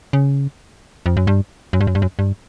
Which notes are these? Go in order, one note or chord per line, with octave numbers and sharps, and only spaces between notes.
C#3
F2
F#2
G2
F#2
G2
F#2
G2
F#2
G2